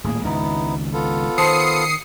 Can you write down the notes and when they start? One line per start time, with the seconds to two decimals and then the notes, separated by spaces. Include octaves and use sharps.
0.04 D#1 A2 A#3 G#4
0.24 G#1 C#2 G#2 B3 D#4 E4
0.93 B3 F4 A4
1.38 D#3 C5 A5 C6 D#6 C7 C#7